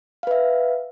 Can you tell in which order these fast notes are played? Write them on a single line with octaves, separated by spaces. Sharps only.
F5 B4 E5